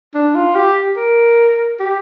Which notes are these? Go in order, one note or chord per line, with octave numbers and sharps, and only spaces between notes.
D4
F4
G4
A#4
G4